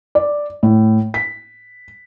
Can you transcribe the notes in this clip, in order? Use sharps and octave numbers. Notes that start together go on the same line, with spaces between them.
D5
A2
B6